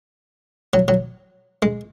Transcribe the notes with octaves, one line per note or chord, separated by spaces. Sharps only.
F#3
F#3
G#3